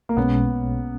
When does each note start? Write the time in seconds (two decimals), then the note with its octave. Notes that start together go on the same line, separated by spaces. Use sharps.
0.09 A#3
0.16 B1 B2 G#3 B3 C#4